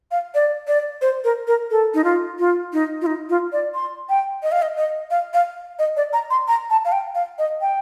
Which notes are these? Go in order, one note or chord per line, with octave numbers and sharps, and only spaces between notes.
F5
D5
D5
C5
A#4
A#4
A4
D#4
F4
F4
D#4
F4
D#4
F4
D5
C6
G5
D#5
F5
D#5
D#5
F5
F5
D#5
D5
A#5
C6
A#5
A5
F5
G5
F5
D#5
G5